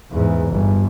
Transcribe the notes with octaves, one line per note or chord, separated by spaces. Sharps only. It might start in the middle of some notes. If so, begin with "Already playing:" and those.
E2 G#2
G1